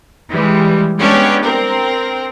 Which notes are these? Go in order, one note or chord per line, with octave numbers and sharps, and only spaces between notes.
E3 G3 G#3
G#3 B3 C#4 D4 G4 C#5
C4 A#4